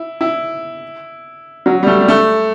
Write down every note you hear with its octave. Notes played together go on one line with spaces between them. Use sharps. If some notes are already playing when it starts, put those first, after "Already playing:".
Already playing: E4
E4
F#3
G3
A3
G3
A3